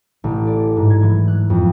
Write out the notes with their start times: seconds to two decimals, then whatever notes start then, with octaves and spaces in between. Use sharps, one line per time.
0.24 A1
0.47 D5
0.77 G#2
0.90 G#6
1.03 E3
1.28 F#6
1.50 F2